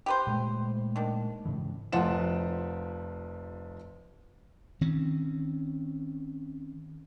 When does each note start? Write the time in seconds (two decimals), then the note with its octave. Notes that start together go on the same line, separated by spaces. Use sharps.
0.06 G4 B4 C5
0.27 A#2 G#3 A3
0.96 D#3 D4
1.45 G#2 C#3 E3
1.92 F1 F3 F4 F#5 E7
4.81 D#3 C4 C#4